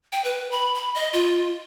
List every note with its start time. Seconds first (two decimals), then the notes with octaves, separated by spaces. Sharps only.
0.12 G5
0.24 B4
0.51 B5
0.75 B5
0.95 D#5
1.13 F4